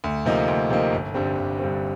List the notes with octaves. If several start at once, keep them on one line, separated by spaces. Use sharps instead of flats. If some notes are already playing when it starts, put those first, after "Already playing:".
D2
C3 F3 A#3 D#4
D2
C3 F3 A#3 D#4
G1
G2 D3 G3 C4
G1
G2 D3 G3 C4